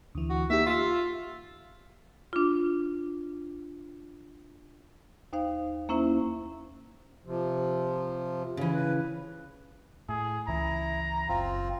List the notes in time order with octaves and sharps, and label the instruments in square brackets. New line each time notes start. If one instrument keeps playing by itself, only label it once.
[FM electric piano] D2 E3
[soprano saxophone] F#4
[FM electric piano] A#3 D#4 G4 [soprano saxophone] E5
[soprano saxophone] F4 [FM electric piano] E5 E6
[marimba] D4 F4
D#2 D#4 C5 F5
A#3 C#4 E4 C5 E5
[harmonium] C3 F3
[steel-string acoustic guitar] C#3 E3
[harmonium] B4
[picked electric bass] A2 [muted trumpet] G#4
[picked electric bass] C#2 E3 [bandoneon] E4 [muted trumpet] A#5
[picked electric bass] F#1 [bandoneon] C4 F4